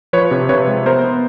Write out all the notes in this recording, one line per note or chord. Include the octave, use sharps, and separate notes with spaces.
F3 B4 C#5
C3
C3 B4 C#5
G#3
B3 A#4 C5
B3